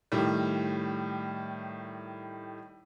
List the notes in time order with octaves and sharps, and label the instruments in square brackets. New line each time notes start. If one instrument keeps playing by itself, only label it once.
[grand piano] A2 D#3 G3